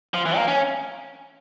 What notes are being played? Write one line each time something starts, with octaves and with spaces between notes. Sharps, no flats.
F3
E3
A#3
C#4